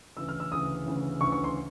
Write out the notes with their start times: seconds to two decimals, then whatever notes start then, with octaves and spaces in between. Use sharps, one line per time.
0.17 D2 C#3 E3 E6
0.28 F6
0.40 E6
0.52 D2 C#3 E3 D#6
0.86 D2 C#3 E3
1.21 D2 C#3 E3 C#6
1.32 C#6
1.44 C6